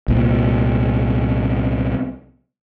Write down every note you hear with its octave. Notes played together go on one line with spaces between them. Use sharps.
C2 A#2